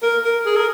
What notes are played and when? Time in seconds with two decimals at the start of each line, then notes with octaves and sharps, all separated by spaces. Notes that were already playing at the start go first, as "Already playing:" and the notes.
0.03 A#4
0.24 A#4
0.46 G#4
0.57 A#4